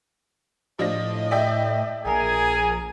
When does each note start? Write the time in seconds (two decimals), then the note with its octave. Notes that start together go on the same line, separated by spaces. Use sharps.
0.79 A2 F3 D4 D#5 A#6
1.31 D5 E5 G5
2.05 A#1 G#4 A#4 G#5